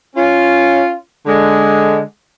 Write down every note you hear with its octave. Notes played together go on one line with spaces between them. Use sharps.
C#4 F4
D3 G#3